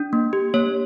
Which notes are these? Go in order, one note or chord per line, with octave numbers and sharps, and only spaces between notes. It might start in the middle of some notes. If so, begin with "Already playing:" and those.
Already playing: D4
A#3
G4
A#3 C#5